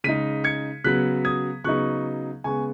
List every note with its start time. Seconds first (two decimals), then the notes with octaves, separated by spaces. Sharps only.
0.04 C#3 G#3 D#4 B6 D#7
0.44 G#6 C#7
0.84 C#3 F#3 B3 F#6 B6
1.25 D#6 G#6
1.64 C#3 F#3 B3 D#4 C#6 F#6
2.44 C#3 G#3 B3 G#5 C#6